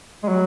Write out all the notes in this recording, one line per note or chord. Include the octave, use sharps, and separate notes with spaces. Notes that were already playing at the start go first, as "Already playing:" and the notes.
G#3
F#3